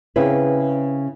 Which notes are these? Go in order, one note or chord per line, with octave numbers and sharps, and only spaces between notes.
C#3 C4 E4 B4